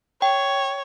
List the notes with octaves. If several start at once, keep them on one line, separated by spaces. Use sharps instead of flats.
C#5 G5